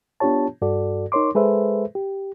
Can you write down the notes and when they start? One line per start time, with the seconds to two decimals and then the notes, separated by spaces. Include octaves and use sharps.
0.20 B3 D4 F4 G4 C#5 A5
0.62 G2 F#4 A4 D5
1.12 D#4 A#4 C#5 C6 D6
1.35 G#3 G#4 A4 B4 C5 E5
1.95 G4